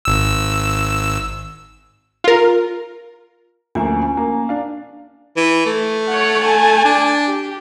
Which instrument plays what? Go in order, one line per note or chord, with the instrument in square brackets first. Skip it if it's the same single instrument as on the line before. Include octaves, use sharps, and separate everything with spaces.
[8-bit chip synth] G#1 E6
[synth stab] F4 A#4
[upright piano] D2 F3 A#3 [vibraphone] C#4 G#5
[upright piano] A#3 A#5
D4 F5
[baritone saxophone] E3
A3
[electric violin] C#5 F#5
G#5 A5
[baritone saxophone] D4
[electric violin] G4